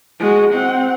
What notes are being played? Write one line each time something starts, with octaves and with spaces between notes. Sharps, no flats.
G#3 F#4
C4 F#5